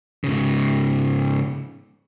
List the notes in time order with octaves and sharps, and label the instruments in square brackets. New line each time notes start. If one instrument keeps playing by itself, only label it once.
[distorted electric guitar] G#2 C#3